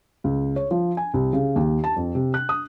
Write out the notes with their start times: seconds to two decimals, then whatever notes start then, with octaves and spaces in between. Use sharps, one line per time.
0.24 C#2
0.56 C#5
0.71 F3
0.97 G#5
1.14 C2
1.33 C#3
1.56 D#2
1.84 A5
1.96 F2
2.15 C3
2.34 F#6
2.49 D#6